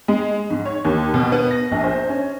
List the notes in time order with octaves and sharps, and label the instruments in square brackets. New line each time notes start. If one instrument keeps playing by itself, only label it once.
[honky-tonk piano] G#3
G#2
C#5
D#2
B2
B3
A#6
A#1
C5
C#4